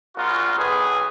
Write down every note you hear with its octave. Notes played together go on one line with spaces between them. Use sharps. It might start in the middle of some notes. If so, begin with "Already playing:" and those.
A#1 F4 F#4 A#4
B1 G#4 B4